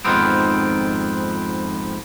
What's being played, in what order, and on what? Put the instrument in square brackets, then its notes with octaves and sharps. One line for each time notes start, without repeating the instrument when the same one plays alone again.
[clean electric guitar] F2 G#2 D#3 F3 B3 C4